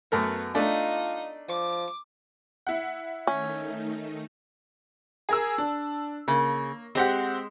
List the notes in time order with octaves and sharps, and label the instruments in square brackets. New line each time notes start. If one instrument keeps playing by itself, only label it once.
[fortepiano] F#2 A3 A#4 [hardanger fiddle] B3
[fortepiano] A3 D4 [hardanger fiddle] D#4 D#5 [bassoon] F4
[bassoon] F3 [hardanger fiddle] D6
[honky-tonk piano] E4 F#5
[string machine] D#3 A3 D#4 [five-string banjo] C#4
[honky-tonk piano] G#4 A#4 E6
D4
[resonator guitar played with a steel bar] C#3 [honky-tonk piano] A#3
[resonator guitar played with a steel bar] G#3 [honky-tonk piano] C4 G4 F#5